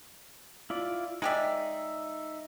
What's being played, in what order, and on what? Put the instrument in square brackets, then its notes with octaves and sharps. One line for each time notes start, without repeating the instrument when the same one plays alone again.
[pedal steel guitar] E4 F4 D5
[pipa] G#3 G4 D5 [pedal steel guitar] D#4 E5